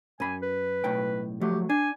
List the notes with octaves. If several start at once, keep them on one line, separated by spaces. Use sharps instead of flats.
F#2 G#5 B5
B4
B1 A2 G5
F3 F#3 A3 G4
D4 G#5